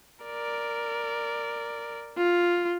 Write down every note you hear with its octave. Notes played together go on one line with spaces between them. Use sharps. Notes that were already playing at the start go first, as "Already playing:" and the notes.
A#4 D5
F4